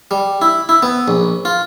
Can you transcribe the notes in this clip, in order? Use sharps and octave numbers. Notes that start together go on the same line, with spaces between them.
G3
E4
E4
B3
A#1
F4